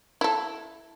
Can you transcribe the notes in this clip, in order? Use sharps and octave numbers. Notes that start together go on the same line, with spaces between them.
E4 A4